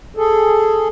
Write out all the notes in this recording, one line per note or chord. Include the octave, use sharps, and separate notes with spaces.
G#4 A4